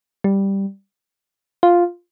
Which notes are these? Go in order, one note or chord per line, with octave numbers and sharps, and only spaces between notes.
G3
F4